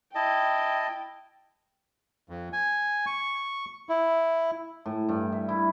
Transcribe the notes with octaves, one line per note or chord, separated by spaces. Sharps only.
E4 D#5 G5 A5
F2
G#5
C#6
E4
A2
G2
E5
E4